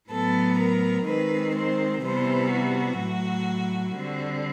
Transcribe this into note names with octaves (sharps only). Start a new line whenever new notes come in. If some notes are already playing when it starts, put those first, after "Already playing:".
A2 F#3 B3 A4
A#4
D#3 G#3 C4 B4
C5
C3 E3 G3 B3 C5
F#4
A2 F#3 A3
D3 G3 C4